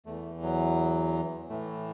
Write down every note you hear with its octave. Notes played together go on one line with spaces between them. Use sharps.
E2 E3 A3
F#3
A2 E3 A3